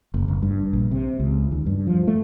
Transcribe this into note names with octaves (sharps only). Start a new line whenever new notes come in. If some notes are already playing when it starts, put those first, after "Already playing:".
F#1
F#1
G2
A#1
C3
C#2
D#2
G2
F3
A3